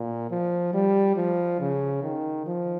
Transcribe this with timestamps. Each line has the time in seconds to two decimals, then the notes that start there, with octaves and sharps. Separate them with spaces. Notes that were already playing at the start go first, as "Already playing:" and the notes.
Already playing: A#2
0.30 F3
0.73 G3
1.16 F3
1.60 C#3
2.02 D#3
2.46 F3